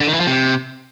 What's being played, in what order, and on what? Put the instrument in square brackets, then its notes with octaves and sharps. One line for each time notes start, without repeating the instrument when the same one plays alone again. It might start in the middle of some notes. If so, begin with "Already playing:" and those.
[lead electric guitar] D3
D#3
E3
F3
C3